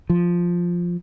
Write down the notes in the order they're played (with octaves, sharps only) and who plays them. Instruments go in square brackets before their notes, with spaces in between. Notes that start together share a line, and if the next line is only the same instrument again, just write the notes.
[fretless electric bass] F3